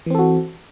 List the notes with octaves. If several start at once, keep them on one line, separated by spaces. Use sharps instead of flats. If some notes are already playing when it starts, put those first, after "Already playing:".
E3 C4 F#4 A4